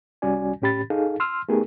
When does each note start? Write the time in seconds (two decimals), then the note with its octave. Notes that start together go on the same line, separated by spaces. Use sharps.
0.22 C2 G3 C#4 F#4 D5 G#5
0.62 A2 C#4 G4 B5 A6
0.90 D#4 G#4 A4 F5
1.20 C6 E6 F6
1.49 A3 B3 D#4 G4 G#4 A#4